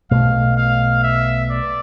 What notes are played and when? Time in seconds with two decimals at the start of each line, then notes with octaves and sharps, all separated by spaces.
0.11 B1 B2 A3 F5
0.57 F5
1.03 E5
1.51 D5